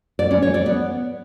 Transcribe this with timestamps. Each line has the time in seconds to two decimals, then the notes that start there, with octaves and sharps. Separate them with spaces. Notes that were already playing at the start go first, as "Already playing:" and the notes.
0.19 D5
0.31 C#4
0.42 C#5
0.54 D5
0.66 B3